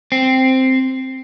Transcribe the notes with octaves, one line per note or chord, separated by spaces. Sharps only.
C4